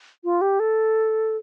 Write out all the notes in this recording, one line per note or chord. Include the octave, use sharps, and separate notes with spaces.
F4
G4
A4